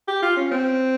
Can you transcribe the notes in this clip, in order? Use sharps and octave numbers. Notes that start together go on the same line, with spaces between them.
G4
F4
C#4
C4